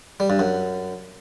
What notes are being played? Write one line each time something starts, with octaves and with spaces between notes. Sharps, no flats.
G3
G2
F#2